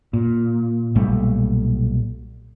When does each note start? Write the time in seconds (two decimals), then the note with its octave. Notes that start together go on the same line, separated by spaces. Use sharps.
0.13 A#2
0.95 B1 A#2 G3 A3